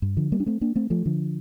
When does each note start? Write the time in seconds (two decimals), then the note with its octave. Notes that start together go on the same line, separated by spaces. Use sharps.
0.02 G2
0.17 D3 F3
0.32 G3 A#3
0.40 D4
0.46 A3 C4
0.61 A#3 D4
0.75 A3 C4
0.90 F3 A3
1.06 D3 F3